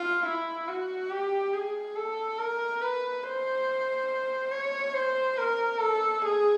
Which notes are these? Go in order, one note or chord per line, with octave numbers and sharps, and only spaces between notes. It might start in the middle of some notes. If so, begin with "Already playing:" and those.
Already playing: F4
E4
F#4
G4
G#4
A4
A#4
B4
C5
C#5
C5
A#4
A4
G#4